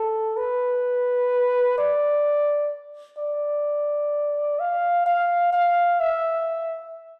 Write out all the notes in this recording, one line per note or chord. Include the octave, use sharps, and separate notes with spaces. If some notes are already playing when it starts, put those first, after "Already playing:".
Already playing: A4
B4
D5
D5
F5
F5
F5
E5